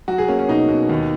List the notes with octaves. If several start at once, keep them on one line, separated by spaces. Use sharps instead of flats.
F#3 F#4
G#4
A#3 C#4
C#4
B2 D#4
B2
D#2